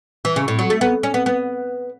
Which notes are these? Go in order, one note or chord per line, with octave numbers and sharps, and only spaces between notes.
E3
C#3
A2
F#3
A3
B3
C#4
B3
B3